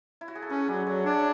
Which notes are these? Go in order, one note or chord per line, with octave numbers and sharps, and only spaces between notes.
E4
F#4
G#4
A4
C#4 G#4 B4
F#3 B4 D5
F#3 A4 C#5
D4 A4 C#5